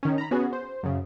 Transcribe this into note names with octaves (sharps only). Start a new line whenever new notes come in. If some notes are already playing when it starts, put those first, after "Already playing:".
D#3 C#4
A#5 B5
B3 C#4 F#4 G#4
C5
F#2 C#3